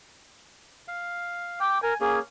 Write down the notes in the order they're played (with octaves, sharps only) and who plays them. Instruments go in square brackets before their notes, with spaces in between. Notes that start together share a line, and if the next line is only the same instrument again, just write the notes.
[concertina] F5
[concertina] G5 [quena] D6
[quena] A#4 [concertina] G#5
[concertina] A#3 C#4 [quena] G#4